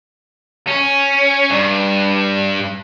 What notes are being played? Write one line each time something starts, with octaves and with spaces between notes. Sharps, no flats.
C#4
G2